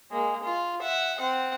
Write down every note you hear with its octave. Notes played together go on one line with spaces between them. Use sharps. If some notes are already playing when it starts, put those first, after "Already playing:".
G#3 A#3
F4
E5 F#5
C4 F#5